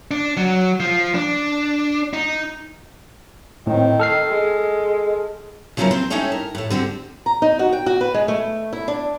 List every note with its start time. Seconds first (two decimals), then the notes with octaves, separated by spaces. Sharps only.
0.11 D4
0.37 F#3
0.80 F3
1.15 D4
2.13 D#4
3.67 A2 D#3 C4
4.00 A4 F6 C7
4.30 G#3
5.77 C#3 F3 F#3 C#4 E4 A#4
5.91 C4 C5
6.10 C#4 D#4 E4 A4 C#5 G5
6.32 A#4
6.55 A2 A3
6.70 D3 C4 F#4 G4
7.26 A#5
7.42 D#4
7.59 F#4
7.73 G5
7.86 F#4
8.01 B4
8.14 G#3
8.28 A3
8.73 E4
8.88 D4